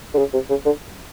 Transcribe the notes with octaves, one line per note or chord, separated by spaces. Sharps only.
D3
C#3
C3
C#3
D3